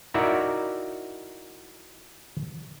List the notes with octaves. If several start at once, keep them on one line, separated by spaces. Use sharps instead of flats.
D#4 E4 F#4 A#4 D5 E5